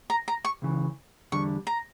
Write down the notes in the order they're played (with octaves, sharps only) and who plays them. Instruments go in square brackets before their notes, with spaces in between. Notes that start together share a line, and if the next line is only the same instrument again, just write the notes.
[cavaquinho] A#5
A#5
C#6
[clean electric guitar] C#2 C#3 E3
[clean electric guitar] E2 D3 G3 [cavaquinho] C#6
[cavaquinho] A#5